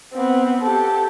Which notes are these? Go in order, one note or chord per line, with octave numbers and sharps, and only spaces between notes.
B3 C4
G4 A4